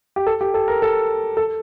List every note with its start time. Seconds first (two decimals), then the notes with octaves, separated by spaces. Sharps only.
0.16 G4
0.27 A4
0.41 G4
0.54 A4
0.68 A#4
0.82 A4
1.37 A4